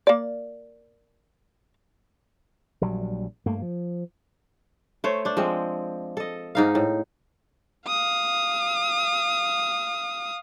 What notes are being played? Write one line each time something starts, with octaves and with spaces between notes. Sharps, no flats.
A#3 D5
A#1 F#3 G3
G2 A3 A#3
F3
A3 C5 C#5
D4 C5
F3 G#3 C4
A4 D#5
G#2 D#4 F5
A2
F5 D#6